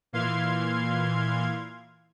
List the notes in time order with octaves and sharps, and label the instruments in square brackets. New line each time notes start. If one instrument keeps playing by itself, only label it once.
[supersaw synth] A#2 E3 F5 C6 G#6